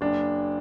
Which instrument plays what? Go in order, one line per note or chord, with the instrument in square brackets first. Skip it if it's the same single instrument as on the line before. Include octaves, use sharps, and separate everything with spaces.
[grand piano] F#1 D4